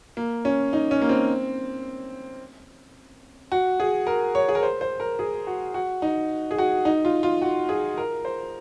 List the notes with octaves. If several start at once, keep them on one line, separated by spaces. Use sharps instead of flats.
A#3
C#4
D#4
C#4
A#3
C4
F#4
G#4
A#4
C#5
G#4
A#4
C5
C5
A#4
G#4
F#4
F#4
D#4
G#4
F#4
D#4
F4
F4
F#4
G#4
A#4
C5